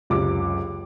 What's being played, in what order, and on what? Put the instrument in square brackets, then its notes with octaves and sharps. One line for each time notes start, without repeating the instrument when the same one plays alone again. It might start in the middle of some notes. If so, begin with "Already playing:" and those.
[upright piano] F#1 C#2 C3 D6